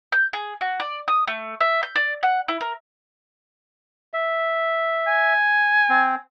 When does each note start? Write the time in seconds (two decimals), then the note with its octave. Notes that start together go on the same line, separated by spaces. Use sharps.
0.12 G6
0.33 G#4
0.61 F#4
0.80 D5
1.08 D#6
1.27 A3
1.61 E5
1.83 G6
1.96 D5
2.23 F#5
2.48 E4
2.61 A#4
4.13 E5
5.07 G#5
5.89 C4